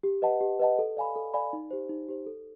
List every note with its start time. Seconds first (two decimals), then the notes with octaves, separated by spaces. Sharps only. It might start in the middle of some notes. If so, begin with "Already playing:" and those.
0.03 G4
0.22 B4 D#5 F#5 A5
0.41 G4
0.60 B4 D#5 F#5 A5
0.79 A4
0.97 D5 F5 G#5 B5
1.16 A4
1.34 D5 F5 G#5 B5
1.53 D#4
1.71 G4 C5
1.89 D#4
2.08 G4 C5
2.26 A4